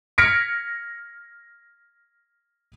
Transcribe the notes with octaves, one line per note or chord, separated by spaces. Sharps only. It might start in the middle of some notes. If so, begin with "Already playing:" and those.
F6 G#6 A#6 B6 C#7 D7